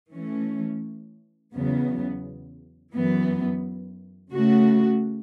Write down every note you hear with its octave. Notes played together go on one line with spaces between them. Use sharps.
E3 A3 C#4
E2 C#3 F#3 B3
F#2 E3 B3
C#3 A3 F#4